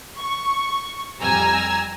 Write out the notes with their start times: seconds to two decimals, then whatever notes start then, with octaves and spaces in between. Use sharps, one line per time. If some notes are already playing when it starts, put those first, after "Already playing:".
0.18 C#6
1.21 F2 G3 G#5 A#5 E6